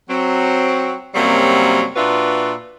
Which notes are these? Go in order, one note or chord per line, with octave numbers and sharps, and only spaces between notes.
F#3 C4
F#2 C3 F#3 G3 A#3 C4
A#2 D4 F4 F#4 B4 E5